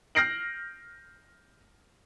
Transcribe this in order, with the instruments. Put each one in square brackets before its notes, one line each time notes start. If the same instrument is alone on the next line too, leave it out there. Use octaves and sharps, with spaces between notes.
[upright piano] F6 G6 A#6 C7 D7 F#7